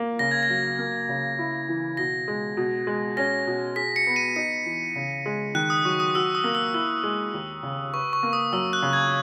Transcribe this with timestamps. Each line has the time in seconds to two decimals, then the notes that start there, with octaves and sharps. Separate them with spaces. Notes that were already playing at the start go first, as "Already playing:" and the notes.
Already playing: A#3
0.19 C#3 A#6
0.31 G#6
0.43 A#6
0.49 F#3
0.79 A#3
1.09 C#3
1.39 E4
1.69 E3
1.97 B2 A#6
2.28 G#3
2.57 B2
2.87 G#3
3.17 C#4 A#6
3.47 B2
3.76 G#4 B6
3.96 C#7
4.07 B3
4.16 D#7
4.36 D#4 C#7
4.66 E3
4.96 C#3
5.26 G#3
5.55 D#3 F#6
5.70 D#6
5.85 F#3 C#6
6.00 D#6
6.15 F#4 E6
6.35 D#6
6.44 A#3
6.55 E6
6.74 E4 E6
7.03 G#3
7.34 D#2
7.63 C#3
7.93 B4 C#6
8.13 C#6
8.23 A#3
8.33 D#6
8.53 F#2 E6
8.73 F#6
8.82 C#3
8.93 G#6